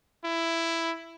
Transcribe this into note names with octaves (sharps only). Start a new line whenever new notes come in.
E4